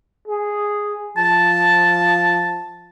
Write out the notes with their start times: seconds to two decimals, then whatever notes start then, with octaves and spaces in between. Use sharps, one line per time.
0.28 G#4
1.17 F3 A5